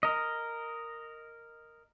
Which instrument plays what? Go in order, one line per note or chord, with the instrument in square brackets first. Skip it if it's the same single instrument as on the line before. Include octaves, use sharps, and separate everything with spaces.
[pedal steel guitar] A#4 D#5